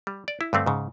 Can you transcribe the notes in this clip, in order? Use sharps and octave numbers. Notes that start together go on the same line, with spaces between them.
G3
D5
E4
G2 D3 A3 C4
G#2 C#3